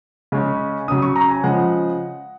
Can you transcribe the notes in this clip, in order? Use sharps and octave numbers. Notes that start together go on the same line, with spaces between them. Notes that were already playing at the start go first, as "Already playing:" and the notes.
C#3 G#3 C#4
C#3 F#3 C#4 D#6
C#6
A#5
G#5
C#3 F3 G#3 F#5